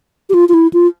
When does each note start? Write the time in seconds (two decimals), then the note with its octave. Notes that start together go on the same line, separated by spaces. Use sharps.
0.29 G4
0.34 F4
0.49 F4
0.54 E4
0.73 F4